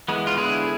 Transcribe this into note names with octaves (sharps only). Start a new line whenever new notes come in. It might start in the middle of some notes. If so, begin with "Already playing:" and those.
E3 G#3 B3
F4
D3 G#3 B3 E4 G#4